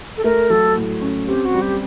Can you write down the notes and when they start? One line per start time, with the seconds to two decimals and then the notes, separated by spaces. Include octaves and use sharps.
0.18 A4
0.24 A3 A#4
0.50 F#3 A4
0.76 A2
1.02 C#4
1.27 C4 G4
1.45 F#4
1.54 G3
1.62 G4